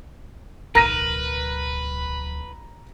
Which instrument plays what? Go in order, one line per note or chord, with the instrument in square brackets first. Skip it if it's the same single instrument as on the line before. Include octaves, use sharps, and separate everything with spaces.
[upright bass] D1 B1 [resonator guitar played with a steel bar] A#4 [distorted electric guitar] B4 [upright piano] A#5 A#6 D#7